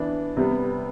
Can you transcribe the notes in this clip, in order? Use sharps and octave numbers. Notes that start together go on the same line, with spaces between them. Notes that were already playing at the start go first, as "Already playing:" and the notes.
Already playing: E3 B3 D4
C3 G3 B3